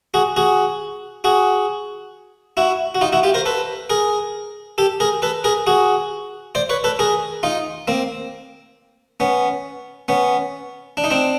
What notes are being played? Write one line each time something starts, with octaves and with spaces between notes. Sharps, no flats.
F#4 G#4
F#4 G#4
F#4 G#4
E4 F#4
F#4
D#4 F4
E4 F#4
F4 G4
A#4 C5
A4 B4
G#4 A#4
G4 A4
G#4 A#4
A4 B4
G#4 A#4
F#4 G#4
C5 D5
B4 C#5
A4 B4
G#4 A#4
D#4 F4
A#3 C4
B3 C#4
B3 C#4
D4
D#4
C4 D4